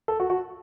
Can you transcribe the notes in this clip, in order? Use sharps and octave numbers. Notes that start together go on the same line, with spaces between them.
A4
F#4
F#4